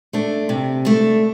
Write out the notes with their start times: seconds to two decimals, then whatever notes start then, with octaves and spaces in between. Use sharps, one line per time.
0.13 A3 D4
0.49 C3
0.85 A3 D4